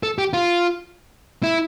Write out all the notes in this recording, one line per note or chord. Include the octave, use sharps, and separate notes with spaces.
A4
G4
F4
E4